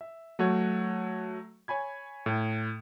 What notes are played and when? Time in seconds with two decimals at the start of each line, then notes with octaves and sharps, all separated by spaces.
0.01 E5
0.39 F#3 A3 F#4 C#5
1.68 C#5 G#5 B5 G#6
2.26 A2